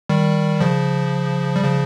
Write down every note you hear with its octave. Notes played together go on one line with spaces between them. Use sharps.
D#3 G3
C#3 F3
G3
C#3 F3